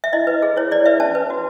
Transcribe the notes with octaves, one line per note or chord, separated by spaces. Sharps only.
E5
E4 D#5
B4
G#4
E4 C#5
E4 D5
B4 E5
C#4 A5
B4
F#4